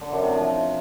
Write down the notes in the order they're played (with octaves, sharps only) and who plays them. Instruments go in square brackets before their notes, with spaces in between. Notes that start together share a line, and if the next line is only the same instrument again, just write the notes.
[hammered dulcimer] D3
F#2
C3
F3